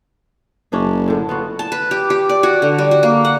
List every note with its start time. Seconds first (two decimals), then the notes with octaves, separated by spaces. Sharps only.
0.72 F#1 C#4 D4 G#4
1.08 A2 D3
1.29 B3 F4 F#4
1.59 A5
1.72 B4
1.91 G4
2.10 G4
2.29 D5
2.43 F#4
2.62 D3
2.78 G3
2.91 F#4
3.03 A#3
3.25 F#5